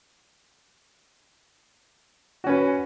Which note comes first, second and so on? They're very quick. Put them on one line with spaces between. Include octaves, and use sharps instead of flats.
F#4 C#4 B4